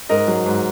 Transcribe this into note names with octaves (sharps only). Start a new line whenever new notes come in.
G#2 A#4 D#5
F#3
G#2